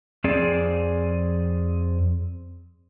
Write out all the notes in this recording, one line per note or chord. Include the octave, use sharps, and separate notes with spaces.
F2 C4 G#4 D5